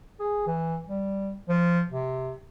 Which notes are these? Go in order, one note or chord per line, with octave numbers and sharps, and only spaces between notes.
G#4
E3
G3
F3
C3